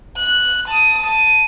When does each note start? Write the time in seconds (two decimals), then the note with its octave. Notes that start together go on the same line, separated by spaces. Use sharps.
0.17 F#6
0.68 A5 D#6
1.03 A5 D#7